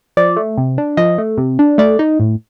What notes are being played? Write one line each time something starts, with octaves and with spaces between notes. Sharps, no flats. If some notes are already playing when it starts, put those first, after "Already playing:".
F3 D5
A3
C3
D4
F3 D#5
A3
C3
D4
A3 D5
D#4
A2